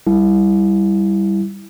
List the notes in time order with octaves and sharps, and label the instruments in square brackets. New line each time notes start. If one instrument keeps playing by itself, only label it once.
[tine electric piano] G3 E4